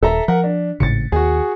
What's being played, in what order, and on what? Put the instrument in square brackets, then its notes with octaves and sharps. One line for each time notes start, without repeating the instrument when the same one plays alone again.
[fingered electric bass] D#1 [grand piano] A4 E5 A#5
[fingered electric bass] F3 [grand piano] A#4 F#5
[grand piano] D4
[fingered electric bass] G#1 A2 C#3 [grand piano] A6 C#7
[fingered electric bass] D#2 [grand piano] F#4 G#4